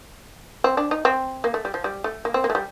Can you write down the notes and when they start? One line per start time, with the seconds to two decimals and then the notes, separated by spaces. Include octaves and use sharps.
0.64 C4
0.77 D4
0.91 D#4
1.05 C4
1.44 A#3
1.54 A3
1.65 G3
1.74 F3
1.84 G3
2.04 A3
2.25 A#3
2.34 C4
2.44 A#3
2.50 A3
2.55 G3